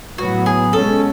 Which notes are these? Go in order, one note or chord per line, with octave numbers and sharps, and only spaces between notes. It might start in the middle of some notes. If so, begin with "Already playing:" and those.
A2 F#3 B3 F#4
G#4
B2 G#3 C#4 A4